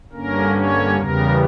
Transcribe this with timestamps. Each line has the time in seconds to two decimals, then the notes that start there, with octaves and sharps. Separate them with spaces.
0.12 G2 D3 A#3 C#4 A#4
0.55 C#5
0.96 E2 C#3 G3 B3 A#4